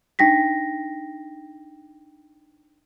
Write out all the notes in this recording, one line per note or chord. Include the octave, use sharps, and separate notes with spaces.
D4 D#4 G5 A#6 B6